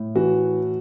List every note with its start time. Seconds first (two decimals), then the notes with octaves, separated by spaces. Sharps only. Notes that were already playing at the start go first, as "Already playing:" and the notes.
Already playing: A2
0.15 E3 F#4